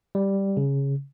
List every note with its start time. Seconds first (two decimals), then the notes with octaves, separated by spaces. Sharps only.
0.15 G3
0.57 C#3